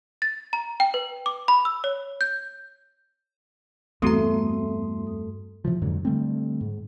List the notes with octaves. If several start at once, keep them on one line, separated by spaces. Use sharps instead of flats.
A6
A#5
G5
B4
D6
B5
E6
C#5
G6
E2 G2 A3 C4 F#4 A#5 C6 D#6
C3 E3 F3
F2 G#2 D3 F#3
D3 G3 A3 C4
G#2